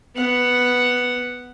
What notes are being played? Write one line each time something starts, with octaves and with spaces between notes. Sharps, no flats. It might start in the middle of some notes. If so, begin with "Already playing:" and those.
B3 F#5